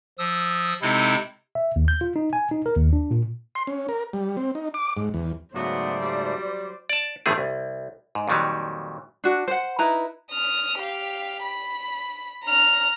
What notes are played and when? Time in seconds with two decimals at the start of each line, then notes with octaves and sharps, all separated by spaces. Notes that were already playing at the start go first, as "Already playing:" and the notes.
0.18 F3 D#6 E6
0.82 C3 G#3 C4 D#4 E4 A4
1.55 E5
1.76 D#2
1.88 G6
2.01 F4
2.16 D#4
2.33 G#5
2.51 D#4
2.66 A#4
2.77 D#2
2.93 D4
3.11 A#2
3.55 C6
3.67 C#4
3.89 A#4
4.13 G3
4.37 C4
4.55 D#4
4.74 D6
4.97 G#2
5.14 E2
5.54 G#2 C#3 F#3 A3 B3 F#4 C5 D5
6.01 G3
6.89 D5 A5
7.26 G1 A2 D#3 F3 A3 G#4
7.38 C2
8.15 G#2
8.28 F2 A#2 D#3 F#3 G3
9.24 D4 F#4
9.48 C5 F#5
9.79 D#4 E4 B4 A#5
10.31 D#6 F6
10.79 G4 F5
11.43 B5
12.45 A#5 F6